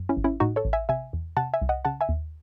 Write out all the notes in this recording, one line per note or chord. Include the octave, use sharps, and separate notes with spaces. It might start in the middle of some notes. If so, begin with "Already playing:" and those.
Already playing: F#2
C#4 E4
G#1
C#4 E4
A2 D#4 F#4
A4 C#5
A1
E5 G#5
C3 E5 G#5
E2
C3 F#5 A5
E5 G#5
C2
D#5 F#5
C#3 F#5 A5
E5 G#5
D#2